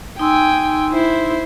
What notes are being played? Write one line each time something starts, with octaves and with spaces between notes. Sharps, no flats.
D#4 G5 G#5 C6 E6
E4 C5